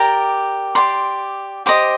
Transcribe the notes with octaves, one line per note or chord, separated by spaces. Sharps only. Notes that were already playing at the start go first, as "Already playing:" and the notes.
Already playing: G4 A#4 D5 A#5
G4 D5 C6
G4 C5 D#5 D6